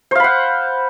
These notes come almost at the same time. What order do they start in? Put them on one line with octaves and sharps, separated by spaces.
C5 F5 B5 F#5